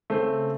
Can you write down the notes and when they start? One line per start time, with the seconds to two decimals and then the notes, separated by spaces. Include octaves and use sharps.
0.10 C#3 A3 C4